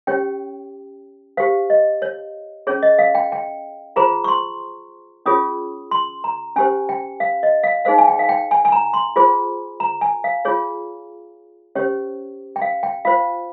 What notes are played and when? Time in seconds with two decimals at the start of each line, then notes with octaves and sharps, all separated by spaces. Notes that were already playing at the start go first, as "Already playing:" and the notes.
0.07 C#4 G4 C#5 G5
1.37 G4 C5 F5
1.70 D#5
2.02 C#5
2.67 C#4 G#4 C#5
2.83 D#5
2.99 F5
3.15 G5
3.32 G5
3.96 F4 G#4 C5 A#5
4.24 C#6
4.28 C6
5.26 C#4 F4 G#4 C#5 D#6
5.91 C6
6.24 A#5
6.56 C#4 G4 C5 G#5
6.89 G5
7.20 F5
7.43 D#5
7.63 F5
7.85 D#4 G#4 C5 F5
7.98 G#5
8.08 G5
8.19 F5
8.29 G5
8.51 G#5
8.65 G#5
8.72 A#5
8.94 C6
9.16 F4 G#4 C5
9.80 A#5
10.01 G#5
10.24 F5
10.45 F4 G#4 C#5
11.75 C#4 G4 C5 C#5
12.56 G5
12.62 F5
12.83 G5
13.05 F4 C5 F5